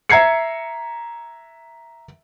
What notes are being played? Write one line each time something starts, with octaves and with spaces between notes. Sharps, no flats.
E5 A#5 G#6 C7 C#7